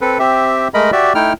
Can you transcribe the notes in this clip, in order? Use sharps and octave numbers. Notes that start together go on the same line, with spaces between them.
C4 A4 B4
C4 G4 E5
G#3 A3 A#4 D#5 B5
F#4 G4 D5 E5
A3 D#4 E4 G5 F6